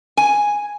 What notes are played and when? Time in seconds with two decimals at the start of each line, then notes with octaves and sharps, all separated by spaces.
0.17 G#5